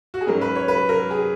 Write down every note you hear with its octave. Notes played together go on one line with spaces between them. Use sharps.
F#4
G#4
G#2 F#3 C#4 A#4
B4
C#5
B4
A#4
G#4